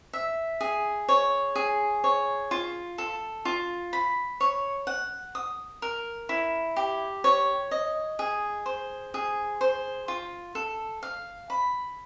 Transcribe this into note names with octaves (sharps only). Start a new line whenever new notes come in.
E5
G#4
C#5
G#4
C#5
F4
A4
F4
B5
C#5
F#5
D#6
A#4
E4
G4
C#5
D#5
G#4
C5
G#4
C5
F4
A4
F5
B5